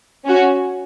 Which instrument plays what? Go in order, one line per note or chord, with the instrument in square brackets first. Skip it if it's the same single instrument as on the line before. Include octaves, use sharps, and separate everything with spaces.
[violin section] C#4 F#4